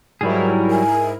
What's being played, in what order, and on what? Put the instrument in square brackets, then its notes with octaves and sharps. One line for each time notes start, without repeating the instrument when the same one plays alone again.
[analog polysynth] G#2 E4 A#4 [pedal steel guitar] F#3 G3 G#4
[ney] G#5